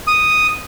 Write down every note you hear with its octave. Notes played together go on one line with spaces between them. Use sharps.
D#6